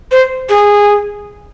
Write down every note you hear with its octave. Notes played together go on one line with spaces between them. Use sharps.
C5
G#4